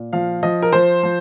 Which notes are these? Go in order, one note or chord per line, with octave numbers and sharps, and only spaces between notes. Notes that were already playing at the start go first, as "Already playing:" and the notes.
Already playing: A#2
F3 F5
F3 D#5
A#4
F3 C5
F3